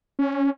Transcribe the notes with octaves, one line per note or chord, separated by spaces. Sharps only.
C#4